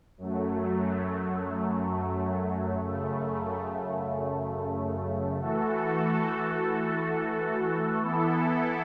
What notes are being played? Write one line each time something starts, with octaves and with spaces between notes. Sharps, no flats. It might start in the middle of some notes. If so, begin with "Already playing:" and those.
F#2 F#3 A3
F#2 C#3 A3
E3 A3 F#4 A4
E3 B3 E4 A4